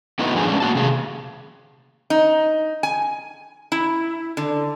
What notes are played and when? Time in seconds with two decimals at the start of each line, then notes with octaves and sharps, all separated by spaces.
0.19 A3 B3 D#4 E4 F#4 B4
0.35 G#2 F3 D4 G#4 G#5
0.48 G#3 C#4 D4
0.60 A#3 F#4 A5
0.75 C3 G#4
2.10 D#4
2.83 G#5
3.72 E4
4.37 D3